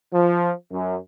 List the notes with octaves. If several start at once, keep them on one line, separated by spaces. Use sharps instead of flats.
F3
F#2